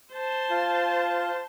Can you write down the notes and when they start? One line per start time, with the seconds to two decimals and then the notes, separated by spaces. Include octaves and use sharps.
0.12 C5 A5
0.50 F4